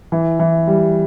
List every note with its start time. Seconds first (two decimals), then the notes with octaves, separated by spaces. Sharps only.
0.12 E3
0.39 E3
0.67 G3